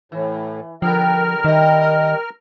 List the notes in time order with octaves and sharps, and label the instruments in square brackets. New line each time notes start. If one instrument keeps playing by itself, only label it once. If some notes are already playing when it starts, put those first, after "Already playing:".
[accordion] A2 [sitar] E3
[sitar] D3 G3 B3 [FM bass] F3 [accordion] A#4 F6 [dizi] G5
[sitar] C3 G3 [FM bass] D#3 [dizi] D#5